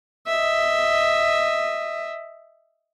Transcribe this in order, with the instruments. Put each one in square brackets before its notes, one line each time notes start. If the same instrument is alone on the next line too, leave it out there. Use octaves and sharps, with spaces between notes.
[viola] D#5 E5